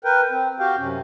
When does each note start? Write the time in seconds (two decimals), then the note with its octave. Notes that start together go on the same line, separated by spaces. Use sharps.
0.05 A#4 B4 G5
0.31 C4
0.60 F#4 G4 F5 G5
0.78 F#2 C3 C#4